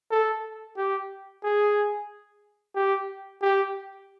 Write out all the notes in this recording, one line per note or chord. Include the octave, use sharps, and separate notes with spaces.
A4
G4
G#4
G4
G4